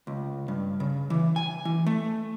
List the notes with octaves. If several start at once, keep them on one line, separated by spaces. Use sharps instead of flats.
C#2
G2
C#3
E3
G#5
E3
A3